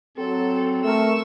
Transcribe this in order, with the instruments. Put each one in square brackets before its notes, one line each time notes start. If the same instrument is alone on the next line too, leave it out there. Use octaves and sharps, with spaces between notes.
[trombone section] F#3 [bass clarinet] C4 [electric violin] A4
[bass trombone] A3 [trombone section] A#4 [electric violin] C#6 E6